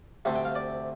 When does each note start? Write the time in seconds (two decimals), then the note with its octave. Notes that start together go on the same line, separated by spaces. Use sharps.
0.25 D2 C3 A3 C4
0.36 G5
0.45 F5
0.55 D5